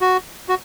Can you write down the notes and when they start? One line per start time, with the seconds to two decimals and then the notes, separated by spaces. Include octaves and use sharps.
0.01 F#4
0.49 F#4